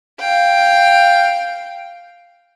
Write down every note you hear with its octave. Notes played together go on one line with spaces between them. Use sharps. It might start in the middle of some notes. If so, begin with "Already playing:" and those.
F5 G5